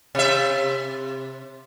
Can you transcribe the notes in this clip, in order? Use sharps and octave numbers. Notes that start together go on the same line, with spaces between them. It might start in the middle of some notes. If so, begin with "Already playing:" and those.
C3 E5